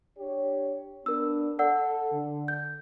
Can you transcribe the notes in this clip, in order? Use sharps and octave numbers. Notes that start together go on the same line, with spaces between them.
D4 G4 C#5
B3 D4 A#4 E6
A4 D5 F#5 E6
D3
G6